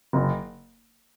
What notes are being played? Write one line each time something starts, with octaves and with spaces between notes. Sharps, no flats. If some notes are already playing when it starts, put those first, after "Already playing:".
F#1